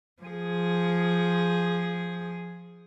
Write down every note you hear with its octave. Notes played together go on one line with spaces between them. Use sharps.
F3 G#4